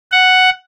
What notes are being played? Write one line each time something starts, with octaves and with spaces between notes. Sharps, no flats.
F#5